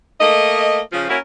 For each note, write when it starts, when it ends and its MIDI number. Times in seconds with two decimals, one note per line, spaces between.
0.21 0.80 57
0.21 0.80 58
0.21 0.80 75
0.92 1.07 49
0.92 1.07 53
1.09 1.17 58
1.09 1.17 61
1.09 1.17 64
1.09 1.17 66
1.09 1.17 70